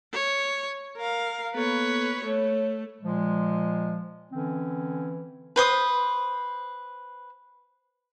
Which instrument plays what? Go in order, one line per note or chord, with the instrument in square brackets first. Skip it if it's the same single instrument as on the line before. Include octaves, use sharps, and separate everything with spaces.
[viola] C#5
A#4 F5
[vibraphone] A#3 B3 A4 [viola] B4 C#5
[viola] A3 [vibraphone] C#5
[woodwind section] A#2 F3 G#3
D3 E3 C4 C#4
[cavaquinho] B4 C5 D#6